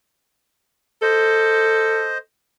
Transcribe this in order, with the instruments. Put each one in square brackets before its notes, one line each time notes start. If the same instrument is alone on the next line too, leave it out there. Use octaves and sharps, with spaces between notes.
[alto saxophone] A4 [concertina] C5 D#5